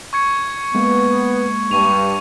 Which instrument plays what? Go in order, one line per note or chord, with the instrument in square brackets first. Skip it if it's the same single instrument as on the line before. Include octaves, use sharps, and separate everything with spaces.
[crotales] C#6 G#6 C#7
[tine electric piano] G#3 A#3 [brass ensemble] B3
[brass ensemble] G2 [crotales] C#6 D#7 F7